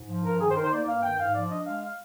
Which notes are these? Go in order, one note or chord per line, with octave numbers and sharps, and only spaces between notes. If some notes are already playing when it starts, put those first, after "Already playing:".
Already playing: G#2
F3
G2 A#4
D#3 G#4
C5
D#4 A#4
C5
A#3 D5
G2 F5
D#3 G5
G#2 F5
F3 D5
D4 D#5
G#3 F5
F5